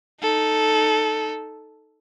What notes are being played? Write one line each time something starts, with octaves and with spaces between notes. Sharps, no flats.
D#4 A4